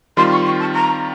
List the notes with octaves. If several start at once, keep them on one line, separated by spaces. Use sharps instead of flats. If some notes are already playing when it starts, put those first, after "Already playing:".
D#3 G3 C4 F4 C6
C#6
C#6
A5
A#5